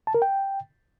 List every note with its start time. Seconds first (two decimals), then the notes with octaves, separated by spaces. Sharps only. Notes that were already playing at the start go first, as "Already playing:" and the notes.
0.07 A5
0.15 A#4
0.22 G5